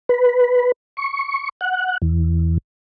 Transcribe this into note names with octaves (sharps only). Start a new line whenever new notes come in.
B4
C#6
F#5
E2